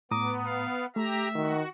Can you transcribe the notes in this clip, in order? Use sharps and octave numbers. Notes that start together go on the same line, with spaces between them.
A2 B3 A#5 D6 D#6
F5
A3 G4 E5 A#5
D#3 F#4